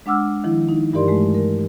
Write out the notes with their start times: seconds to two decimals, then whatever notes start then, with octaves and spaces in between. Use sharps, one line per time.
0.06 G#3 D4 F#5 D6 E6 F6
0.44 D#3 F3 E4
0.69 D#4
0.93 G2 E3 G4 A#4 D5 C6
1.08 G#3 A3
1.35 A#4